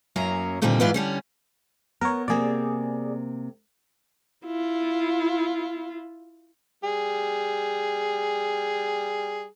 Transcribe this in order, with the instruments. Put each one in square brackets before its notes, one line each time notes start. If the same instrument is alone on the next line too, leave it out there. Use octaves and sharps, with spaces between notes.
[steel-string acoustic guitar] F#2 F#3 A#3 C#4 A#5
G2 A#2 D3 D#3 G3 C4
G#2 E3 F#3 F4 B4 D5
D3 G3 C#4
[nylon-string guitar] B3 [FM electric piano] A#4 C#5
[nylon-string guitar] C3 A#3 C4 [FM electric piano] G#4 D5
[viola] E4 F4
[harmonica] G3 G#4